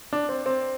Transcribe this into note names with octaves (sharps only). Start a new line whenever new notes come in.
D4
C4
C4